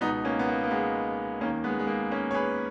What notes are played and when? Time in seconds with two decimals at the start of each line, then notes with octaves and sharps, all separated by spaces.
0.01 C#2 B2 B3 D#4
0.25 A#3 C#4
0.39 B3
0.48 A#3
0.64 A#3
0.71 G#3 B3
1.41 D#2 D#3 A#3 C#4
1.64 G#3 B3
1.79 G#3
1.87 A#3
2.11 A#3 C#4
2.31 C#5
2.34 G#4 B4